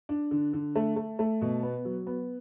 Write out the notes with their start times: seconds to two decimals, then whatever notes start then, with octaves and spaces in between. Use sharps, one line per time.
0.09 D4
0.31 D3
0.53 D3
0.76 A3
0.96 A3
1.19 A3
1.41 B2
1.63 B3
1.85 F#3
2.07 B3